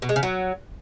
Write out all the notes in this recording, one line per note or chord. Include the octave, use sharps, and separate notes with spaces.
B2
G#3
C#3
F#3